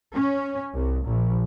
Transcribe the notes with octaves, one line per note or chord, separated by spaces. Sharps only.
C#4
C2
A#1